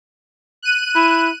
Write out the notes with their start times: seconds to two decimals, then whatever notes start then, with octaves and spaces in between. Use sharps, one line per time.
0.62 F#6 D#7
0.96 E4